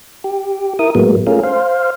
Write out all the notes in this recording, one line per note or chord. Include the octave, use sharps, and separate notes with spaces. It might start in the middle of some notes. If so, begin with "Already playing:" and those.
G4
E4 A#4 D#6
A2 F#3 G#3 A#3 B3
A3 C#4 F4 G#4 A#4
C5 F5